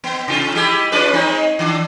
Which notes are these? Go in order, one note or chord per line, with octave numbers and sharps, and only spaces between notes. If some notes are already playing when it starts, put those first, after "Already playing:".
B3
C3 F4
G#3 E4 G4
C#4 F4 B4
G#3 C4 D#4
D#3 D4